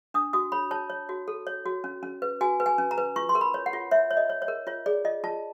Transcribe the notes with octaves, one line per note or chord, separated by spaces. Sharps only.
D4 D#6
F#4 D#6
C#5 B5
C#5 A5
C#5
F#4
A4
C#5
F#4
C#4
C#4
B4
F#4 G#5
B4
G#5
C#4
A#5
B4
F4 C#6
C6
A#4
B5
C#5
F#5
F4
C#5 E5
C#5
D#5
C#5
C#5
A#4
F4 C#5
G#4 D5
F4 D#5
F4 A5